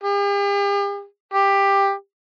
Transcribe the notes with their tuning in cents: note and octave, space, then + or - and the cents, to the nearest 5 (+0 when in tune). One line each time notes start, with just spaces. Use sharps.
G4 +45
G4 +15